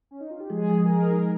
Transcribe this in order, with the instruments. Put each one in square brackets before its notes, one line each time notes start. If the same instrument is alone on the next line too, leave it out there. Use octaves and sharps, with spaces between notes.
[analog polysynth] C#4
D#4
F4
G4
[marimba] F3 [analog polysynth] G#3 G#4
[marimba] F3
[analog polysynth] A#4
[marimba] F3 [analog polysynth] G#3 G#4
[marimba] D#4 [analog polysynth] G#4
[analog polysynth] A#4